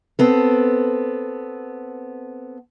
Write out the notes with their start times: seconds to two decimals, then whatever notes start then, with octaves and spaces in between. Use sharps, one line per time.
0.19 B3 C4 A4